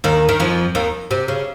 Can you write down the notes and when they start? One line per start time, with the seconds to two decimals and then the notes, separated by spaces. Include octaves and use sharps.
0.04 D#2 D#3
0.29 D#3
0.40 F2 F3
0.75 D#2 D#3
1.11 C3
1.28 C#3